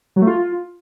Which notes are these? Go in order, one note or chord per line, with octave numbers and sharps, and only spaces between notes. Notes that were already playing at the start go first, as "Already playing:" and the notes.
F#3
A3
F4